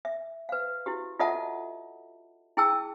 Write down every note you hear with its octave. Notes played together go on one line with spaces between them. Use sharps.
E5
B4 F5
E4 F#4 G4
F4 A4 D#5 E5 F#5 A5
E4 G#4 G5 A5 E6